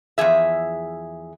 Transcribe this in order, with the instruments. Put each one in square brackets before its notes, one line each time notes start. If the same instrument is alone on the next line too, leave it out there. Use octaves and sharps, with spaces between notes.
[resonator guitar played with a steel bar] E2 D#3 F3 G#4 E5